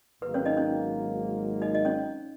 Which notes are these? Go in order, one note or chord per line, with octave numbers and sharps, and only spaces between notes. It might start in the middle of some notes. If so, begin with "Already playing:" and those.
G#1 G#2 F#3 A#3 B4
C#4 C#5
D#4 D#5
C#4 C#5
D#4 D#5
D#5
C#4 C#5